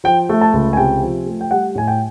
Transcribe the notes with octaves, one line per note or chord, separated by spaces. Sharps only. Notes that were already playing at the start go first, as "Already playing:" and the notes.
F3 G5
A3
A5
C#2
G#5
C3 G5
F3
A3
G5
G3 F#5
A2 G#5
G5